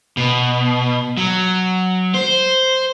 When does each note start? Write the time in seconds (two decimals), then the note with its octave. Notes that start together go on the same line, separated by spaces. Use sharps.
0.17 B2
1.17 F#3
2.14 C5